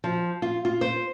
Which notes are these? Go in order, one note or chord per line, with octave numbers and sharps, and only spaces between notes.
F3
F4
F4
C5